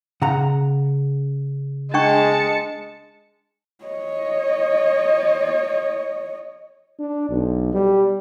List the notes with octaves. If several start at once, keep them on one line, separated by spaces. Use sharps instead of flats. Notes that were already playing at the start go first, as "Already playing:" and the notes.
C#3 F#5 A#5
G#3 D4 G5 A5 C#6 C#7
C#5 D#5
D4
B1
G3